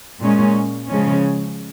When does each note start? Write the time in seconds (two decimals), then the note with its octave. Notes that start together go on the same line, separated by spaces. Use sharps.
0.20 A#2 G#3 C#4
0.88 C#3 F3 G#3 C#4